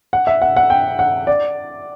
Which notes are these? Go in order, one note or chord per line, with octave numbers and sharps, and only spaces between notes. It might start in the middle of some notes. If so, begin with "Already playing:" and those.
F#5
E5
F#5
F#5
G5
F#5
D5